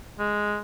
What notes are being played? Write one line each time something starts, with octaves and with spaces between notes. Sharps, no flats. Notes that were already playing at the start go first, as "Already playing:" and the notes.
G#3